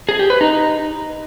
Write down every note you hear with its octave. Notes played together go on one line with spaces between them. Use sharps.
G#4
G4
B4
D#4